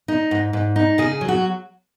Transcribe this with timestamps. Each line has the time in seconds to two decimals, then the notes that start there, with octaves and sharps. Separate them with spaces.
0.08 D#4
0.31 G#2
0.53 G#2
0.76 D#4
0.98 C#3 G#4
1.21 F#3
1.28 F#4